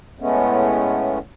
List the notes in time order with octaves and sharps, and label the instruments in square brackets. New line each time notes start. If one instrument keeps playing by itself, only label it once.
[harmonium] A2 G#3 A3 B3 C#4